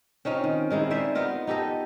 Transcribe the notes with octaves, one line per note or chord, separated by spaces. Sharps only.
C4 C#4 D#4 F4
D#3
D#3 G#3 D#4 E4
D#4 C5 D5 E5
B3 D#4 F4 A#4
D#4 G4 A4 D#5